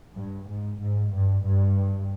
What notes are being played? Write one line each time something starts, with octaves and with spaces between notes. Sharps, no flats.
G2
G#2
G#2
G2
G2